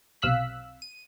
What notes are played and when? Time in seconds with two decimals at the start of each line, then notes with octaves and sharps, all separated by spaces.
0.22 B1 C3 F5 E6 F#6 B6
0.82 D#7